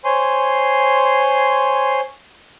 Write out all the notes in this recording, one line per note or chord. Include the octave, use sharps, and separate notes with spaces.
C5 C#5 G#5 C6